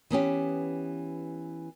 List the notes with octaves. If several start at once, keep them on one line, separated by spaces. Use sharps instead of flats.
E3 B3 C#4 G4